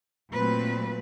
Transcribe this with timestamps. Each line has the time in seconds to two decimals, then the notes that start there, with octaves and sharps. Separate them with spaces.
0.33 A#2 F#3 A3 C4 B4